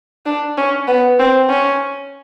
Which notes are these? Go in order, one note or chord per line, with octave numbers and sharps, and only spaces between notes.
D4
C#4
B3
C4
C#4